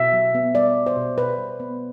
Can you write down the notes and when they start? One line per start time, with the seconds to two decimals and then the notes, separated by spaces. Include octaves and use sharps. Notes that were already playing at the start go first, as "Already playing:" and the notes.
Already playing: B2 E5
0.13 F#3
0.35 B3
0.55 G3 D5
0.76 B3
0.86 C5
0.96 B2
1.18 B2 B4
1.38 G3
1.60 B3